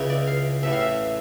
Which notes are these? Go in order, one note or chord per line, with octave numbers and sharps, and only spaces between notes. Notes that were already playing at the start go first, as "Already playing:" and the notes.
Already playing: C#2 C#3 E3
D5
F5
A1 A2 E3 E5
F5
E5